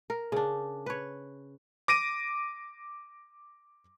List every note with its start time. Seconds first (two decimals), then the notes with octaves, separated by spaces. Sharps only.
0.10 A#4
0.32 C#3 D4
0.86 B4 C#5
1.88 D6 A#6 D7 D#7